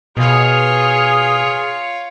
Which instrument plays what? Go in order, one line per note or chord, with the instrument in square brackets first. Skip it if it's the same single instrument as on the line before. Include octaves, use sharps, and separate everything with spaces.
[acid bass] B2 [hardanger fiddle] F4 C#5 [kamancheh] G#4 F6 [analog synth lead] D#6